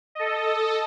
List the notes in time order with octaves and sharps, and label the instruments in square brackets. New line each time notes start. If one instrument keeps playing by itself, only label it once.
[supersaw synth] A4 D#5